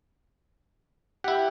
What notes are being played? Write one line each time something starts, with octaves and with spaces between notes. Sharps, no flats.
E4 G4 F#5